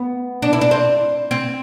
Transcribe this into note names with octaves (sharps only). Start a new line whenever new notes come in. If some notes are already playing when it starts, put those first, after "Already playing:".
Already playing: B3
D4
E4
D4
C4
C4